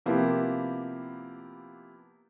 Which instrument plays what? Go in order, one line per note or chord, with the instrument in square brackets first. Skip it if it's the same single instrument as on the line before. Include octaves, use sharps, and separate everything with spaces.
[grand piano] C3 F3 A#3 B3 E4 G4